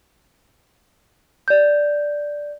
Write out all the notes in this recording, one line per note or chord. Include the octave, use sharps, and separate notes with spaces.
D5 G6